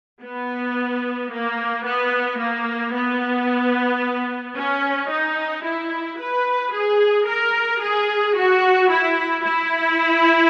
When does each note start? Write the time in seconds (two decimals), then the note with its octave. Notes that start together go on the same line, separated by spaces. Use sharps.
0.23 B3
1.32 A#3
1.85 B3
2.40 A#3
2.94 B3
4.56 C#4
5.11 D#4
5.65 E4
6.20 B4
6.74 G#4
7.28 A#4
7.82 G#4
8.37 F#4
8.90 E4
9.45 E4